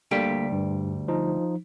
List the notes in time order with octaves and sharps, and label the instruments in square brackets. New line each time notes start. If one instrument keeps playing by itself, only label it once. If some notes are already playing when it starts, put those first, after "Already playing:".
[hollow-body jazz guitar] D2 G3 G4 [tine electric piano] D3 A#3 B6
[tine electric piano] G2
F3 D#4